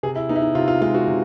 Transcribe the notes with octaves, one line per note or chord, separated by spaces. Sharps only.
C3 G#4
E4
B3 D#4
E4
D#4
C3 F4
F4
G#3 F4
F#4
C3